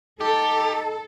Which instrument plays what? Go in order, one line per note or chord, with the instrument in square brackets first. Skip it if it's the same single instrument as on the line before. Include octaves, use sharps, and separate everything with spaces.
[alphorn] D#4 [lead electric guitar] G4 [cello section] A4 [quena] A5